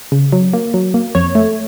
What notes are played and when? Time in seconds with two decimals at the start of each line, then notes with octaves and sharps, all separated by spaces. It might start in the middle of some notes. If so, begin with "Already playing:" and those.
0.12 C#3
0.32 F#3
0.53 A#3
0.74 F#3
0.94 A#3
1.15 F2 C#5
1.35 A3